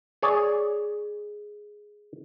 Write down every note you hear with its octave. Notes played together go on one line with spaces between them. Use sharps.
G#4 C#5 D5